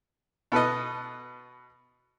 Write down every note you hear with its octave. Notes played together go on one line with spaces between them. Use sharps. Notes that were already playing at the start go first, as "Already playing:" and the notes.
B2 A4 B4 D#5